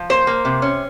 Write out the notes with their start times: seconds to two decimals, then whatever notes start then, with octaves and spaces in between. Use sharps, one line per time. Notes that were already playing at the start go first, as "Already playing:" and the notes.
Already playing: F3
0.10 A#3 C5
0.27 A#3
0.45 C3
0.62 C#4